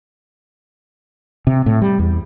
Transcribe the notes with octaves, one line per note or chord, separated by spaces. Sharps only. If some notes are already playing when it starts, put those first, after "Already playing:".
C3
A2
G3
E2